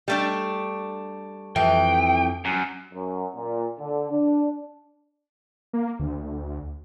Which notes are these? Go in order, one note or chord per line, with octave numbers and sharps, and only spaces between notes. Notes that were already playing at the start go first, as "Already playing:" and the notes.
G3 A3 D4
F2 E3 G5
F#2
F#2
A#2
D3
D4
A#3
D2